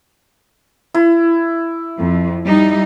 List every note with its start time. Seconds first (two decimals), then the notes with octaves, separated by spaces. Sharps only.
0.94 E4
1.99 F2
2.43 G3 D#4